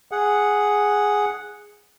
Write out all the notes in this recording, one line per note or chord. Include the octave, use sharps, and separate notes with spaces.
G#4 F#5